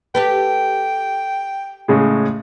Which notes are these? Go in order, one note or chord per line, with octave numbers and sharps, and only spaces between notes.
G4 A4 B4 G5
A2 C#3 G#3